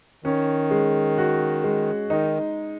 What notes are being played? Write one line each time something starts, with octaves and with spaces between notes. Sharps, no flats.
D#3 C#4
G#3
F#4
G#3
D#3 D#4